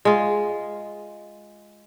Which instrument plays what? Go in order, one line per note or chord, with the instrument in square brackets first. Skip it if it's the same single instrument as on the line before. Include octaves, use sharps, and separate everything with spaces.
[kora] G#3 F4